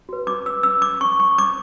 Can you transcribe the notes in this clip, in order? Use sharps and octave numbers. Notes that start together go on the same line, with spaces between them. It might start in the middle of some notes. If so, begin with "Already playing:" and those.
F#4 B4
D6
E6
E6
D6
C#6
C#6
D6